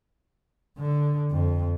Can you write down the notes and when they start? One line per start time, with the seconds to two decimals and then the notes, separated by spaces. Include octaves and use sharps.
0.78 D3
1.31 F2